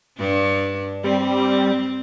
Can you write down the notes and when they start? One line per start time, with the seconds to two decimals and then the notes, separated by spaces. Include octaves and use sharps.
0.18 G2 D4
1.04 G3 C4